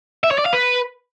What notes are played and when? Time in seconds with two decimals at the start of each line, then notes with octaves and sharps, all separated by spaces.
0.24 E5
0.31 C#5
0.39 D5
0.46 F5
0.53 B4